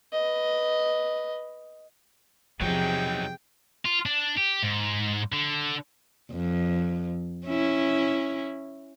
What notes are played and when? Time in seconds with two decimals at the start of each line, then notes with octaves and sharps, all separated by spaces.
0.13 B4 D#5
2.61 E2 C3 F3 F#3 D#4 G#4 G5
3.85 F4
4.06 D4
4.37 G4
4.62 G#2
5.32 D3
6.31 F2
7.46 C#4 E4